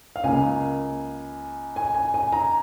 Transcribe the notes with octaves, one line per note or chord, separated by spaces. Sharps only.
F5
C#2 C#3 A#3 G#5
G#5
G#5
G#5
A#5